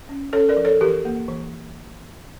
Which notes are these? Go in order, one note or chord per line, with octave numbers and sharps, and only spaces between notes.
C#4
C#4 A4 C#5
A#4 D5
F3
A4 C#5
E3 G4 A#4
A#3
E3